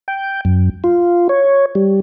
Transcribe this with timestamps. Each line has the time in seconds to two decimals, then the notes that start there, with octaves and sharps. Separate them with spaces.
0.08 G5
0.45 F#2
0.84 F4
1.29 C#5
1.75 G3